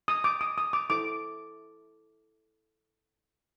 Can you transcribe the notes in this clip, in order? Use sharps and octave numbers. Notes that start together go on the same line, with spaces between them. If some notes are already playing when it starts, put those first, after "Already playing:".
D#6
D6
D#6
D#6
D6
E4 A4 C5 D6